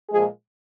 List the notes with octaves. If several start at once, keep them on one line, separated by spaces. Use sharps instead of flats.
A#2 F3 G#3 G#4